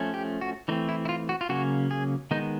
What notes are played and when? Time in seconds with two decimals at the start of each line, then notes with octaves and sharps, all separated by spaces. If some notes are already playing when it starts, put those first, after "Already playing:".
Already playing: F3 A3 C#4
0.14 G4
0.41 F#4
0.68 E3 A3 C4 D#4
0.89 E4
1.05 E4
1.09 F4
1.29 F#4
1.41 F4
1.49 C#3 F#3 A#3 C#4 F#4
1.91 G#4
2.31 D#3 G#3 B3 D#4